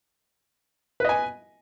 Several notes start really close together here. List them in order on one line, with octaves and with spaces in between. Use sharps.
B4 D#5 G#5